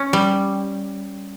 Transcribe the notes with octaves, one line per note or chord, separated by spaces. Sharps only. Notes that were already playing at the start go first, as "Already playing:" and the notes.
Already playing: C#4
G3